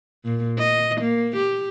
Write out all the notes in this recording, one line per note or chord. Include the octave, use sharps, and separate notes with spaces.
A#2
D#5
A#3
G4